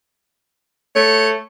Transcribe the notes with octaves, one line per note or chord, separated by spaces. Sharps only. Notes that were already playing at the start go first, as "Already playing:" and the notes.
A3 C#5